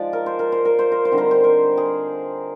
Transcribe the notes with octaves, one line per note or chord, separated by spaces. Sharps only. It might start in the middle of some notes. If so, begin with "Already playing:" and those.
Already playing: F3 G#3 D#4 D5
A#4
C5
A#4
C5
A#4
C5
A#4
C5
D3 G3 C4 D#4
A#4
C5
A#4
G#4